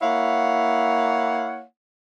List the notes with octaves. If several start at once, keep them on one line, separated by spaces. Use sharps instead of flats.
A#3 E4 C#5 F5 F#5